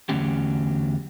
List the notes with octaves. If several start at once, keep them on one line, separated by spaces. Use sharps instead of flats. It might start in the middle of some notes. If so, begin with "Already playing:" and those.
E2 D3 F#3 A3 C#4 G4